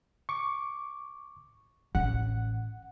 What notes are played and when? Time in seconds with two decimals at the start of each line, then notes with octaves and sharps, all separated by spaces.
0.29 C#6 D6
1.95 A1 F#5